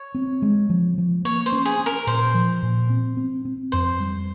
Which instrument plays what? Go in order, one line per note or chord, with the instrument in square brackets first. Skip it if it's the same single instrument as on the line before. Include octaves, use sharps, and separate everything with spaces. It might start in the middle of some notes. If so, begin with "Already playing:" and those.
Already playing: [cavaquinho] C#5
[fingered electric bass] C4
G#3
F3
F3
[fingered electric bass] A#3 [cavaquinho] C#5
[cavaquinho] C5
[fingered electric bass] C#4
[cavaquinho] G#4
[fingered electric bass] C#4
[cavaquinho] A#4
[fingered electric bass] A#2 [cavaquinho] C5
[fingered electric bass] F3
A#2
C4
C4
C4
[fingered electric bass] F2 [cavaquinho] C5
[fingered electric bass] G3